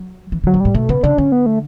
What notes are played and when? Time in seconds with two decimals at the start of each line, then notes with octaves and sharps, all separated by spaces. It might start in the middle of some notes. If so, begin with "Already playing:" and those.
Already playing: F#3
0.32 E3
0.44 D3 F#3
0.54 B2
0.60 A2 G3
0.75 B2 A3
0.89 C#3 B3
1.03 C#3 D4
1.18 D3 C#4
1.32 B3
1.46 A3